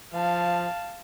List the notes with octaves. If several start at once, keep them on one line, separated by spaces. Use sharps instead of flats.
F3 F5 A5